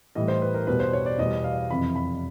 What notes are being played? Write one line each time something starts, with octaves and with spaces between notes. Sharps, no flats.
A2 E3 G3 D#5
C5
B4
A#4
E2 B2 G3 B4
C5
C#5
D5
E2 B2 G3 D#5
F5
F2 C3 E3 B5
B5